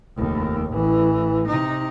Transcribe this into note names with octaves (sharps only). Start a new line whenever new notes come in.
F1 D#2
A1 E3
C3 D#4